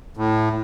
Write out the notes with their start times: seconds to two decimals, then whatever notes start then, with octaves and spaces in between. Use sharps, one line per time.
0.17 A2